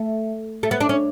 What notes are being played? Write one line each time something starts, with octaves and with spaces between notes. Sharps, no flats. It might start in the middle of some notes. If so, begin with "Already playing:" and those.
Already playing: A3
A3
B3
D4
C#4